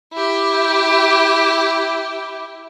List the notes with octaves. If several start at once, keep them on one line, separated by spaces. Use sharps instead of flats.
E4 G4